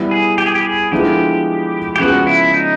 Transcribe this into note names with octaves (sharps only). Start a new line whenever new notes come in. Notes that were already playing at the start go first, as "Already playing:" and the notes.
Already playing: G3 B3 E4
G#4
G4
G#4
G4
G#4
D3 F3 G#3 B3 E4 G4
G4
C#3 F3 G#3 B3 F#4
E4
D#4